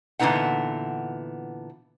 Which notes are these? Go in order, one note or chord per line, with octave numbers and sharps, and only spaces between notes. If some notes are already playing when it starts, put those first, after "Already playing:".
A#2 D3 E3 B3 D#4 F#5